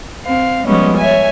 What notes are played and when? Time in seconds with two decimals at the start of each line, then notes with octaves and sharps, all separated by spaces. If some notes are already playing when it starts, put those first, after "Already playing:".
0.24 C4 F5
0.66 F3 G3 G#3 B3 C#4 D#5
0.98 C#5 E5 G#5